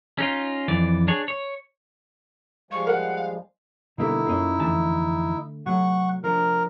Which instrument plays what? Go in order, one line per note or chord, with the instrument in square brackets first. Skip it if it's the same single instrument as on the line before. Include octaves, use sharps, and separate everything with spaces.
[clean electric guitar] C#4 D#4 F4
F2 E3 D5
D4 G#4 C#5
C#5
[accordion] F3 G3 G#3 [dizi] F5 [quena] C#6
[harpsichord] A#4 [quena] F#5
[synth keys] B2 G3 A4 [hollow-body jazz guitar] D3 A#3 B3 [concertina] D#4 E4
[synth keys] F#2 C#4 F4 [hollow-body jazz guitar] A#3 D#5
[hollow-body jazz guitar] F2 E3 A5 [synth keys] D3 A3
[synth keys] C3 A3 [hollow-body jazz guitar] F#3 [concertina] F#5 C#6
[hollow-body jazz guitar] F3 D4 [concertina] A#4